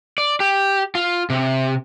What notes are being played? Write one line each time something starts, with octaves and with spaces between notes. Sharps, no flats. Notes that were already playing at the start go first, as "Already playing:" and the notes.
D5
G4
F4
C3